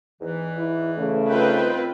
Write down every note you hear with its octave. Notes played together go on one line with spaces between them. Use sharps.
E2 G#2 E3
E4
C#3 A3
C2 D#3 C4 F4 B4 G5